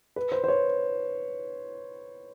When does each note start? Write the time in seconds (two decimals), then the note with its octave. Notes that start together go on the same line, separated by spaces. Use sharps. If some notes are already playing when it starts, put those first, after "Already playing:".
0.16 B4
0.32 C5
0.44 C5
0.48 C#5